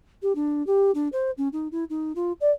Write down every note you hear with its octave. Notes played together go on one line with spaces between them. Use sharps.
G4
D4
G4
D4
C5
C#4
D#4
E4
D#4
F4
D5